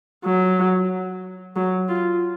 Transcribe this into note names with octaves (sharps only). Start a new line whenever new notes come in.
F#3
F#3
F4